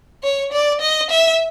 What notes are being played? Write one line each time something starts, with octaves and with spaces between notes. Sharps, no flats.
C#5
D5
D#5
E5